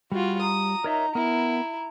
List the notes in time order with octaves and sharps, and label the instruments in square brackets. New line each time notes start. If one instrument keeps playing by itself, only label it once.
[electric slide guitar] G3 [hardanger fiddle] F4 F#4
[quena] A#5 [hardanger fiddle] D#6
[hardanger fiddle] D#4 [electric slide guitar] A#4 C#5 E5
[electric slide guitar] B3 A#4 [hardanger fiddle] E4